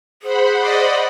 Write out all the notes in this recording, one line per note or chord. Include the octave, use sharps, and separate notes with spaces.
G#4 C5 F#5 B5
D5 D#5